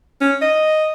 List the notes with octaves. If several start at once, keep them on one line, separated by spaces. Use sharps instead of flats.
C#4
D#5